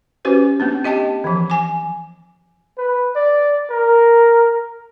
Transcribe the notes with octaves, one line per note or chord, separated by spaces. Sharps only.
C#4 F#4 G4 B4 C5
A#3 C4 D4
G4 D#5 G5 A5
E3 F3
G#5 D6
B4
D5
A#4